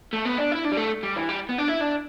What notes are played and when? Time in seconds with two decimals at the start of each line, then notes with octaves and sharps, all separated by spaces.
0.13 A3
0.26 B3
0.39 D4
0.52 E4
0.65 D4
0.72 G3
0.77 A3
1.03 G3
1.16 E3
1.29 G3
1.49 B3
1.58 D4
1.68 E4
1.81 D4